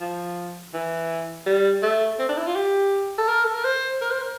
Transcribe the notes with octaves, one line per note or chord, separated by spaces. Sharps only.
F3
E3
G3
A3
C4
D4
E4
F4
G4
A4
A#4
A4
A#4
C5
A#4
C5
A#4